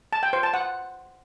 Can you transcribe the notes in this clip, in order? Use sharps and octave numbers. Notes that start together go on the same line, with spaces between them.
A5
G5
C5
A5
F#5